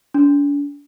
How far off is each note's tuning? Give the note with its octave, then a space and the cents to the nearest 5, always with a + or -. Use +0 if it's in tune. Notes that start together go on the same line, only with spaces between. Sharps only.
D4 -45